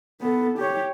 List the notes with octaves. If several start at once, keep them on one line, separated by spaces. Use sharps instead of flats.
B3 A4
G4 C#5